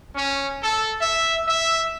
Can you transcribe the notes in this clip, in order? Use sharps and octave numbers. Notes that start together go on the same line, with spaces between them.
C#4
A4
E5
E5